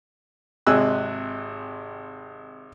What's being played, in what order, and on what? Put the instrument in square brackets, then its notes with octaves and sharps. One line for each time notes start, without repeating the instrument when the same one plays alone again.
[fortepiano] G#1 C3 G#3 G#5 E6 F#6